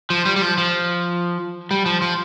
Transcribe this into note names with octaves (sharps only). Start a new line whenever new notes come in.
F3
G3
G3
F3
F3
G3
F3
F3